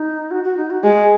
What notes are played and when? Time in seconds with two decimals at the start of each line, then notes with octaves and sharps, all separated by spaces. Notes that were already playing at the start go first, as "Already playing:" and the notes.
Already playing: D#4
0.31 F#4
0.44 F#4
0.57 D#4
0.70 F#4
0.83 G#3 G#4